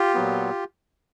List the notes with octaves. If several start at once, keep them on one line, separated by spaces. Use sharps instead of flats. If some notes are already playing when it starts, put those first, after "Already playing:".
Already playing: F4 G4
A#2 F#3 B3